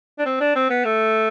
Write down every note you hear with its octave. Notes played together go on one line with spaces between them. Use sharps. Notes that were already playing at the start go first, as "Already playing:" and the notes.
D4
C4
D4
C4
B3
A3